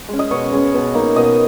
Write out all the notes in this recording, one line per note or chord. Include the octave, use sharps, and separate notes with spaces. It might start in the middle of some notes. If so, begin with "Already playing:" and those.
G#3 C#4
D#5
B2 C#5
G#3 C#4
B2
A#3 D#4
B2 D#5